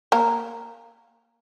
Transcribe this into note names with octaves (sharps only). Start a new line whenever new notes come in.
A#3 A#4